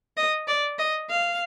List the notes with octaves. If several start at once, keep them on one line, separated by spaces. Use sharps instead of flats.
D#5
D5
D#5
F5